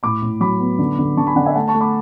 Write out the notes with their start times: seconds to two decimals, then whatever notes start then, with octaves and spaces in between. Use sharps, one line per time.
0.03 A2 B5 D6
0.22 A2
0.40 F#3 B5 D6
0.60 B3
0.79 D3
0.98 D3
1.17 D3 A5 C#6
1.27 G#5 B5
1.36 D3 D5 F#5
1.46 E5 G#5
1.55 A3 F#5 A5
1.68 A5 C#6
1.74 A3
1.81 B5 D6